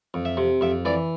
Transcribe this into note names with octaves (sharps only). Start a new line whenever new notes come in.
F2
E5
C3
F2 E5
E3 D5